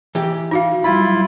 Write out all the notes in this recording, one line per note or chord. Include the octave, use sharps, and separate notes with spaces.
E3 G4
D#4 F#4 F5
F#3 G3 E4 F4 B5